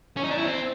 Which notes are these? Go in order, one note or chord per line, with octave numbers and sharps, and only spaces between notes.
C#4
D#4
D4
E4
C4